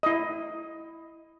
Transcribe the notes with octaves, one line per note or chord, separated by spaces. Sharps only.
E4 D#5